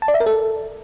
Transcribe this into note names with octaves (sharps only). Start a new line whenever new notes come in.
A5
D5
E5
A#4
A4